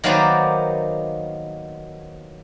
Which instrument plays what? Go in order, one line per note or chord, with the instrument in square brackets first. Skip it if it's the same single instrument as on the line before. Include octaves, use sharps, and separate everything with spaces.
[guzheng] D#3 F#3 A#3 B3 C5 D5